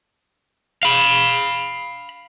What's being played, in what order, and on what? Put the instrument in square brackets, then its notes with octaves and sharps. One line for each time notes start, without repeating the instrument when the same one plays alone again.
[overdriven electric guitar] F5 B5